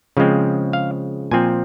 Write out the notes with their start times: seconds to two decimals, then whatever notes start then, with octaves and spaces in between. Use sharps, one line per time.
0.17 C#3 F3 G#3 C4
0.73 F5
1.31 A#2 F3 C4 G#5